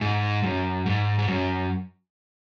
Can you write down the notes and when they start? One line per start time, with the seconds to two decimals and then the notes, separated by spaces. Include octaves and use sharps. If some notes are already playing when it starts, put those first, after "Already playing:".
0.01 G#2
0.43 F#2
0.86 G#2
1.19 G#2
1.28 F#2